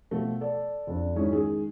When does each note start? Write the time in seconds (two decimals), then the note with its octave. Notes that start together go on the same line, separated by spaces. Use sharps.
0.11 B2 F3 A3
0.41 A4 D5
0.87 F2 D4
1.16 G#2 D#3 G#3 C#4 E4
1.32 D#3 G#3 G#4